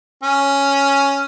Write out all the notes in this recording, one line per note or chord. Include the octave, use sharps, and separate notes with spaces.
C#4